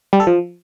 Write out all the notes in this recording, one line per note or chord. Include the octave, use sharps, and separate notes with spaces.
G3
A4
F3